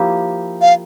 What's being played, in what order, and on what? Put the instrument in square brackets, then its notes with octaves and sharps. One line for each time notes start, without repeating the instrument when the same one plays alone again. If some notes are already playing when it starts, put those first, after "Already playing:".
Already playing: [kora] F3 A#3 E4 G4
[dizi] F5